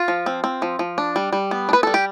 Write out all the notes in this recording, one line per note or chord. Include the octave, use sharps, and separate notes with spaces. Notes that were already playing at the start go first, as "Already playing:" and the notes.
Already playing: F4
F3
C4
C4
F3
F3
D4
G3
G3
B3
D4
B4
G3 A4
G4